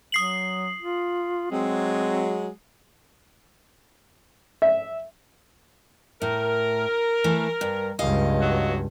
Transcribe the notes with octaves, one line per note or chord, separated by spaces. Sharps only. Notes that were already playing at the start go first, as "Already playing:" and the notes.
F#3 D#6 C7 F#7
F4
F#3 G#3 C4
E5
A2 A#4
E3 A3
G2
C#2 G2 D#5 F5
B2 F#3 F#4